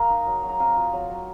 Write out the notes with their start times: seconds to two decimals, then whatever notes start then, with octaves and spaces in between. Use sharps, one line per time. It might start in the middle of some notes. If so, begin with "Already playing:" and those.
Already playing: A#3 G#4 A#4 F5 G#5 A#5
0.10 D#4
0.27 F#3
0.43 F#3
0.49 A#5
0.60 C4 F5 G#5
0.76 F4
0.93 F#3
1.10 F#3